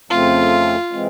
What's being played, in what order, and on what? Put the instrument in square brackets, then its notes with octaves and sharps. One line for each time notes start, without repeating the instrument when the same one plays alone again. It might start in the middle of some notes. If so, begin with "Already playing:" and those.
[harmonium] F2 C#3 F3 A3 C4 [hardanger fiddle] F4
[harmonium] C3 E3 G#3 C4